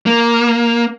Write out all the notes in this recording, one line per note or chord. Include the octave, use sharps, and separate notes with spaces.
A#3